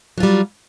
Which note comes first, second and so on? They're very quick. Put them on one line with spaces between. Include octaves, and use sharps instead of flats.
F#3 F4 G3